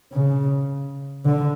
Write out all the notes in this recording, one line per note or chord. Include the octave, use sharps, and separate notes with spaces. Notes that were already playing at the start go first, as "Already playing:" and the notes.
C#3
D3